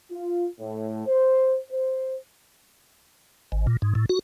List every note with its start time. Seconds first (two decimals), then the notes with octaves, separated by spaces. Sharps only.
0.10 F4
0.59 A2
1.06 C5
1.71 C5
3.52 G#1
3.67 A#2
3.82 G#2
3.95 A2
4.09 F#4